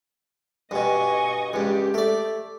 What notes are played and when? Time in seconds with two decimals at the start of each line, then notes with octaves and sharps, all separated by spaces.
0.71 G2 B2 D#5 G#5 C#6
1.53 C#2 G2 G4
1.94 A3 D5